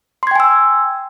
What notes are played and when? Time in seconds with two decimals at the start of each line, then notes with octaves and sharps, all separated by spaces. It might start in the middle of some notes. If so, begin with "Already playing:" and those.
0.23 C6
0.27 G#6
0.31 G5
0.36 G#5
0.40 E6